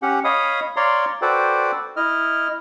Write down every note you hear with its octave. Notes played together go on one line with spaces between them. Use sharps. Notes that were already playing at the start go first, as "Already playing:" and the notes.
C#4 G4 F#5
C#5 D#5 F5 B5 D#6
C#5 D5 F5 A#5 C6
F#4 A4 B4 C5 D5 G5
E4 D#5 F6